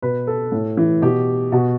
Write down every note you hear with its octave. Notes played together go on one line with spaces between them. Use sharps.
B2 B4
A4
A2
E3
B2 G4
B2 F#4